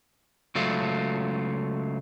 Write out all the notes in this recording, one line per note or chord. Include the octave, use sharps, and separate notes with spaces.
C#2 F#3 A3 F4